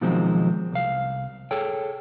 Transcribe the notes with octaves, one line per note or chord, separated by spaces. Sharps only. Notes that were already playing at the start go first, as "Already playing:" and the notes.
B2 D#3 F3 F#3 G#3 C4
C2 F5
G#4 A4 C#5 G5